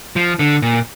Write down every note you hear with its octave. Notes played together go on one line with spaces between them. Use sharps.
F3
D3
A#2